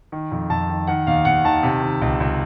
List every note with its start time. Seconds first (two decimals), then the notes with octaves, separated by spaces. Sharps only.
0.12 D#3
0.32 F2
0.50 F2 A5
0.70 D#3
0.87 D#3 F#5
1.07 D#2 F5
1.25 D#2 F#5
1.44 D#3 A5
1.63 C3
1.82 D#3
2.01 C#2
2.20 C#2